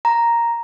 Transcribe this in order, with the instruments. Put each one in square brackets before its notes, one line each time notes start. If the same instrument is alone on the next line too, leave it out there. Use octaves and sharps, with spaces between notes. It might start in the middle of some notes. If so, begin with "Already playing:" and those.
[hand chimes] A#5